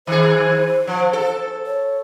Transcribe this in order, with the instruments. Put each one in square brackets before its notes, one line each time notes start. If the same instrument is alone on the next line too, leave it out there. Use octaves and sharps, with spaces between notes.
[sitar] D#3 G#4 [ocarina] C5
[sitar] F3
A4
[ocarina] C#5